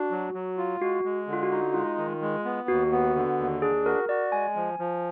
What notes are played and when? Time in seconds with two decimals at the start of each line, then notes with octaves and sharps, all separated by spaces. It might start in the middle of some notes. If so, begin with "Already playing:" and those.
Already playing: D4 F#4
0.11 F#3
0.34 F#3
0.57 F4
0.81 G#3 F#4
1.05 G#3
1.27 D3
1.33 F4
1.43 F#4
1.51 D#4
1.74 G#3 F4
1.98 D#3
2.22 G#3
2.45 B3
2.68 D#2 F#4
2.92 B3
3.15 D3
3.38 D#2
3.62 D4 G#4
3.85 F#4 A#4
4.09 F#4 D5
4.32 G#3 G#5
4.56 F3
4.79 F3